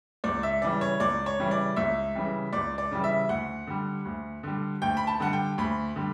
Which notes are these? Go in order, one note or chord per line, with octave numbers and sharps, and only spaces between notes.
C#2 D5
E5
C#3 E3 G3 D5
C#5
C#2 D5
C#5
C#3 E3 G3
D5
C#2 E5
C#3 E3 G3
C#2 D5
D5
C#3 E3 G3
E5
D2 F#5
D3 G3
D2
D3 G3
D2 G5
B5
A5
D3 G3 F#5
G5
D2 B5
D3 G3